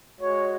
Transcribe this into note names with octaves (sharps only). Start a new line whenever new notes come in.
G#3 F#4 C#5